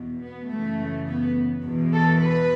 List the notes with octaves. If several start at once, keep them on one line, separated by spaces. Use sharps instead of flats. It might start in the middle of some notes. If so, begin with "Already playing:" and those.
Already playing: E2 B2
B3
F#2 C#3 E3 A3
B3
E2 B2
A4
B4